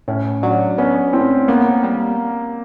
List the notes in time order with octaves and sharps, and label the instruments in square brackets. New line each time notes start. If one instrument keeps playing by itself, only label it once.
[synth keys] A2 [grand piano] C#4
[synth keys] F#3 [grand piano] D4
[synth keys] B3 [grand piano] C#4
[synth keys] A2 [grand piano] C4
[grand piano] A#3 [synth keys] B3
[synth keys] G3